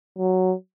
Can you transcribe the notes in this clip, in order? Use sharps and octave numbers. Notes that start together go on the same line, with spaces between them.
F#3